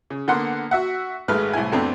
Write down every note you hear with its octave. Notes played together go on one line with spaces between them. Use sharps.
C#3
D3 A#3 B3 F#5 C6
F#4 E5 F#5
G#1 G#3 A3 B4 F6
C2 A2 E4 G#5
F2 A3 B3 C4 D4